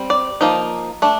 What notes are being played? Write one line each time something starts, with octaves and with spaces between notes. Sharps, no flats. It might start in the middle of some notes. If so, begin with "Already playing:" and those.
Already playing: G3 C4
D5
F3 A#3 D#4
A3 D4